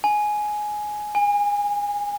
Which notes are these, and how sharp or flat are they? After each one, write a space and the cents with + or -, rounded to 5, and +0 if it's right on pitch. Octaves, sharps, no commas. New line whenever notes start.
G#5 +10
G#5 -25